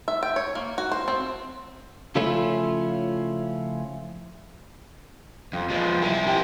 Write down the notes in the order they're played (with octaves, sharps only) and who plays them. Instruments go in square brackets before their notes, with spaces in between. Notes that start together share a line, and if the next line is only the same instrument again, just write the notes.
[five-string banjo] E5
G5
C#5
A#3
F#4
C5
C4
[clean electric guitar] C#3 F3 A3 C#4 E4 F4
[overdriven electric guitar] F2
F3 G#3
E4 A#4
E4 G4